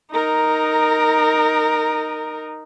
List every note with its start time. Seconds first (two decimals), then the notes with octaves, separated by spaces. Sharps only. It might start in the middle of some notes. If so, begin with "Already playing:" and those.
0.12 D#4 A#4